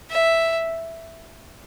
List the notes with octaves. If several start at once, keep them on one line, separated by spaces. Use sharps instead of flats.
E5